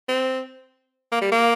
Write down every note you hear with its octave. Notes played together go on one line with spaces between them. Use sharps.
C4
A#3
G3
A#3